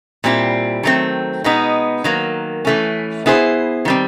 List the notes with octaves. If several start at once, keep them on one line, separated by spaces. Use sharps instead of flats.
A#2 G3 C4 E4
D#3 F#3 A3 C4
B2 G#3 B3 D#4
D#3 F#3 A#3
E3 A3 C#4
B3 E4 G#4 C5
D#3 G3 C4